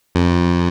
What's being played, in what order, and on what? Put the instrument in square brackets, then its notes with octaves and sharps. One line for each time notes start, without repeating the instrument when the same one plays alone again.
[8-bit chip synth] F2